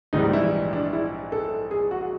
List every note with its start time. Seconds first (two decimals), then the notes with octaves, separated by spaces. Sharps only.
0.13 A#1 G#2 E3 G3 D#4
0.33 E4
0.73 D4
0.93 E4
1.32 A4
1.71 G#4
1.91 F#4